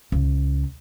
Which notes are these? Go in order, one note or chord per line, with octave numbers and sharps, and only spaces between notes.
C#2